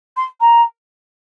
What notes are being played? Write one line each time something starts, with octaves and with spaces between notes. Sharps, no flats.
C6
A#5